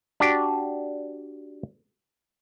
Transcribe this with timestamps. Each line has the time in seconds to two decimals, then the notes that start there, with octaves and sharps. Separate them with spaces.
0.20 D4 F#4 G4 D5